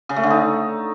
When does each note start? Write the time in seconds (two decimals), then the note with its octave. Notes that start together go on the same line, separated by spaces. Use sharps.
0.09 C#3
0.16 A3
0.23 D3
0.30 D#4